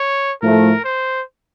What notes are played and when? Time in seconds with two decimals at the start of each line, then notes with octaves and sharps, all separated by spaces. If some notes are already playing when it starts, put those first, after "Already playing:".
Already playing: C#5
0.42 A2 F3 A3 A#4
0.84 C5